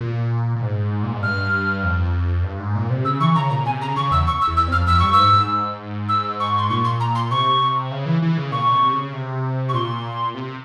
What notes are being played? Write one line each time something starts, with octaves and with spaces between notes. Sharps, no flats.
A#2
A#2
G#2
A#2
G#2
G2 F6
F2
G2
G#2
A#2
C3
C#3 E6
E3 C#6
C#3 A#5
A#2 A#5
C3 G#5
C#3 A#5
C#3 C#6
E2 E6
C#6
E6
E2
E6
F2
F6
F2 E6
G2 C#6
E6
G#2
G#2
E6
C#6
C6
A#2 C#6
C6
A#5
C6
C3 C#6
C#3
E3
E3
C#3
A#2 C#6
C3
C3
C#3
C3
C#6
A#2 C6
C3